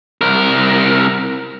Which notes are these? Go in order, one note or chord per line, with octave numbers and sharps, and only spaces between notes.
C2 A#4